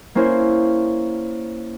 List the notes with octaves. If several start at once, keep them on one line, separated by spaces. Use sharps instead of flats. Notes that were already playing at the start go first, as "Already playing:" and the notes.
A#3 C#4 E4 C5